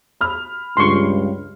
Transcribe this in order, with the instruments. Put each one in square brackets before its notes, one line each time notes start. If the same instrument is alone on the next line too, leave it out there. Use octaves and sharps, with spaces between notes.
[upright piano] B5 F6
[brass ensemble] C#2 [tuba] G2 [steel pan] C6 C#6